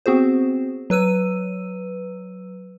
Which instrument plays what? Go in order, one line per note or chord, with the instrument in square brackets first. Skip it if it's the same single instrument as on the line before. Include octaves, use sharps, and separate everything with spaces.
[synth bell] B3 C4 F#4 G#4 C5
F#3 B4 E6 D#7